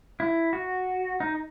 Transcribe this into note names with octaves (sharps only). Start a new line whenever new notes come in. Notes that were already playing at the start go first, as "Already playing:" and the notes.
E4
F#4
D#4